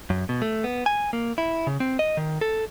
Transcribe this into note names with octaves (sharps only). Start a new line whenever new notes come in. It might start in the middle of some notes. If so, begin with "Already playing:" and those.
F#2
B2
A3
B3
G#5
A#3
E4
C#3
C4
D#5
D#3
A4